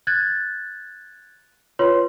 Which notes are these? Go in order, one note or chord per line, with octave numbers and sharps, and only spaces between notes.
F#6 G#6 A6
F4 B4 C#5 C6